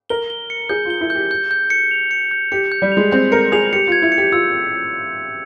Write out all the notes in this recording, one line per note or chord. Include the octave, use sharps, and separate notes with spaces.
A#4 G7
G7
C#7
G#4 G6
F4 G7
E4
G6
G4
G6
G6
C#7
F7
C#7
G6
G4 C#7
G6
G3
F7
G#3
C4 G6
A#4 C#7
G#4 F7
G4 C#7
F4 G#6
E4
C#7
G4
F4 E6